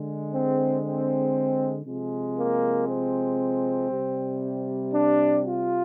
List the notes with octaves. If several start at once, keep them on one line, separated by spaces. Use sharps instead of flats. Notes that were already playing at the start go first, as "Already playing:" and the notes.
Already playing: D3 G#3
C4
C4
C3 F3 G#3
A#3
C4
C3 G3
D4
F4